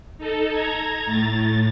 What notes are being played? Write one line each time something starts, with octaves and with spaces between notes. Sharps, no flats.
D#4 A4
A#5 G#6
A2 A6